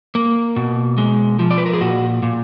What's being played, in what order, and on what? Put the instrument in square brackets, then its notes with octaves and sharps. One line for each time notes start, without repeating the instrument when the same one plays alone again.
[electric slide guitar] A#3
B2
G#3
F3
D5
B4
A#4
G#4
A#2 F#4
A#2